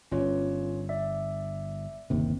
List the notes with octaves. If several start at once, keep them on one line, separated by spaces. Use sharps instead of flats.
G1 C#4 F4 C#5
D5 E5
G1 D#2 C3